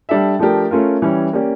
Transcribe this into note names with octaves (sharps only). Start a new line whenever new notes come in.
G3 D4 A4 E5
F3 A3 D4 G4 A#4
A3 C#4 F4 A#4
E3 G3 C#4
A#3 C#4 G4 D5